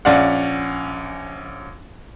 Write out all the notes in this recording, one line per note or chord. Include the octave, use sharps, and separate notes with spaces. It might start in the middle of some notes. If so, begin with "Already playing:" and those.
A#1 C#4 D5 F5 F#5